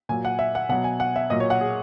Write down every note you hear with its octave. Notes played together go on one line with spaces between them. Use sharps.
A#2 F#3 G#5
F#5
E5
F#5
B2 F#3 F#5
G#5
F#5
E5
A#2 F#3 D#5
C#5
F#5
G#4